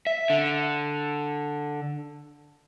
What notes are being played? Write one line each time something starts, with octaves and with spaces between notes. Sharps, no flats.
E5
D3